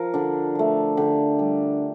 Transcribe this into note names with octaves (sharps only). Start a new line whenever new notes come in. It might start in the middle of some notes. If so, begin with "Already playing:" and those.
Already playing: F3 A#4 F5
D3 D4
F3 A3
D3 G4
G3